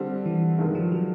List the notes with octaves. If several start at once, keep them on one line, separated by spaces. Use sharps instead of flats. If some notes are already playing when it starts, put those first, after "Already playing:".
Already playing: D3 G3 C4
E3
G2 D#3 G#3
F3
F#3